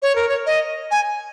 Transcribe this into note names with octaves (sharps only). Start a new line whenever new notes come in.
C#5
A#4
C#5
D#5
G#5